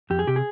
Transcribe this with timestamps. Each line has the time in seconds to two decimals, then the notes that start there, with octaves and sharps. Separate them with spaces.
0.10 F2 G4
0.19 G#4
0.27 C3 G4
0.36 G#4